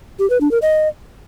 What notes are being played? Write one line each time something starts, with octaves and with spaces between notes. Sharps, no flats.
G4
B4
D4
A#4
D#5